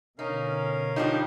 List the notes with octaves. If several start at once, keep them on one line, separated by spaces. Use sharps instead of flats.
B2 D3 C#4 D#4 A#4 F5
F3 G3 D4 D#4